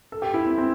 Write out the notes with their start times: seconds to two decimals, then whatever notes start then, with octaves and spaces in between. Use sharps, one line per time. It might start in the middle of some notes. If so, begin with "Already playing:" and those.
0.12 A4
0.22 G4
0.34 E4
0.46 C4
0.58 C4